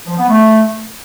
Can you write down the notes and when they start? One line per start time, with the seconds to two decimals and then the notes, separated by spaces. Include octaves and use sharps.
0.06 F3
0.17 B3
0.28 A3